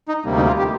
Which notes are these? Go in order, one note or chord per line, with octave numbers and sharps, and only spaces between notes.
D#4
D2 C3 G3 A#3
D#4
F4
G4